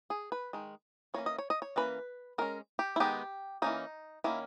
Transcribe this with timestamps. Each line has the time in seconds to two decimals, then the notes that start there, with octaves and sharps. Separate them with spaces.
0.10 G#4
0.32 B4
0.53 D#3 G#3
1.14 E3 A#3 C#4 C#5
1.26 D#5
1.38 C#5
1.50 D#5
1.62 C#5
1.76 E3 A#3 C#4 B4
2.38 G#3 C#4 A#4
2.79 G4
2.96 E4
3.00 D#3 G#3 B3 D#4 G4
3.62 E3 A#3 C#4 D#4
4.24 D#3 A#3 C#4 E4